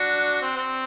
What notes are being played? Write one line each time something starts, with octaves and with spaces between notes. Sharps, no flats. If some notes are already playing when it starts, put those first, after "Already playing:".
Already playing: D4 F#4
C4
C4